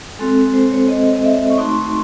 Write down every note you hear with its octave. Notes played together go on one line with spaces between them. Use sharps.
G#3 C4 F#4 A4
C5
C#5
D#5
D#5
E5
C#6
A3 D#4 F#4 C6